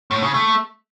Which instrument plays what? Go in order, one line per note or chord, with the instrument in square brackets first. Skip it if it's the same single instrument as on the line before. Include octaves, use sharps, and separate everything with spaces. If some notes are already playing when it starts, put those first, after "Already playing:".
[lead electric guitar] A2
C#3
A3